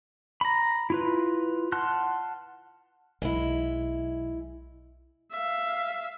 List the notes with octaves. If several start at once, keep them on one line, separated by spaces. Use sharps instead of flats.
A#5 B5
E4 F4 B4
F#5 A5 C6 F6 F#6
B1 G#3 E4
E5 F5